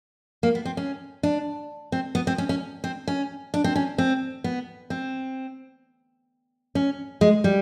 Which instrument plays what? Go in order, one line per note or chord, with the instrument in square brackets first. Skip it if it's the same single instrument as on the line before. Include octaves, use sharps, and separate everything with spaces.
[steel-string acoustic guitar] A#3
B3
C4
C#4
D4
C4
B3
C4
C#4
C#4
C4
C#4
D4
C4
C#4
C4
B3
C4
C#4
G#3
G3